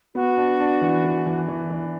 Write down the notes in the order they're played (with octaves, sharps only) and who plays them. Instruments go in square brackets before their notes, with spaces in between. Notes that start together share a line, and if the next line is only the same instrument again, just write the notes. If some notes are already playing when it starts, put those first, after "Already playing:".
[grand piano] B3 [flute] F#4
[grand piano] D4
D4
E3
E3
E3
E3
E3